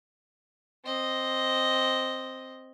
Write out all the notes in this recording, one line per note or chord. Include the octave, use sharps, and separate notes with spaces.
C4 D#5